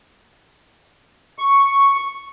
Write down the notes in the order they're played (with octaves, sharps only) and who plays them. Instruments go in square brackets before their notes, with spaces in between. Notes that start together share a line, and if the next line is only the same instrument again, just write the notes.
[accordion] C#6